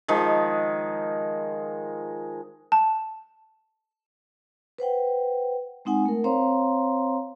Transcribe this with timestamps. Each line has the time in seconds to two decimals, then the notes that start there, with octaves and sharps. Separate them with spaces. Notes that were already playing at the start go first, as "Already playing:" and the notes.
0.08 D#3 F3 G#3
2.72 A5
4.78 B4 C5 F#5 G5
5.85 G#3 C4 D#4 F#5 G#5
6.05 A3 A#4
6.24 C4 C5 C#5 F5 A#5 C6